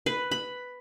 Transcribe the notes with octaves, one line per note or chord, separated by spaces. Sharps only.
B4
B5